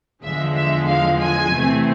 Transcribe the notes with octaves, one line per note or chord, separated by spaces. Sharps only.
E2 D3 F3 G#3 E5
E5
F5
G#5
E2 C3 E3 A3 C4